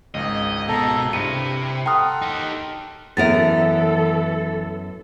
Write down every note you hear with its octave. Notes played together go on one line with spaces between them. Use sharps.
G#1 C#2 D#5
B2 A4 A#5
G2 C3 E4 C#7 D#7
A4 F#5 G5 A#5 C6 D#6 F6
D#4 G4
F#2 E3 B3 A4 A#4 E5 A6